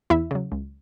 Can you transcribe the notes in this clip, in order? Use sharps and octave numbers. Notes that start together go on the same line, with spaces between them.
E2 E4 E5
C#3 F#3
C#2